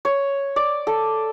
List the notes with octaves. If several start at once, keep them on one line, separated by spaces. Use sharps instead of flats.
C#5
D5
A4